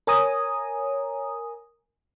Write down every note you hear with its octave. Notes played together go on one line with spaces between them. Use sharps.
A#4 C#5 G#5 A#5 D#6